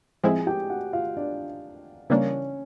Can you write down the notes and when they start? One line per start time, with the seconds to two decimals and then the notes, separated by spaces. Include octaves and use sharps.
0.23 A2 F3 G#3 C4 E4 G#4 G#5
0.40 G#5
0.47 G4 G5
0.70 F#4 F#5
0.93 F4 F5
1.17 D4 D5
2.10 C#3 E3 G3 A#3 C#4 D4 C#5